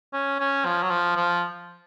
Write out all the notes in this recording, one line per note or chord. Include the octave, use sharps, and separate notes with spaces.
C#4
C#4
F3
F#3
F3
F3